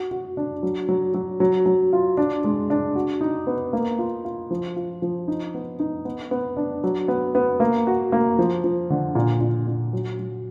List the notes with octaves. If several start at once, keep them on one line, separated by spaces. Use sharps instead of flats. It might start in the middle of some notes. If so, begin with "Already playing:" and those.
Already playing: F#4
F#4
D4
F#3
F#3
F#3
F#3
F#3
F4
D4
G#3
D4
F#4
D#4
B3
A#3
F4
F4
F3
F4
F3
D#4
B3
D#4
B3
B3
D4
F#3
B3
B3
A#3
F#4
A#3
F3
F3
D3
A#2
A#2
A#2
F#3
F#3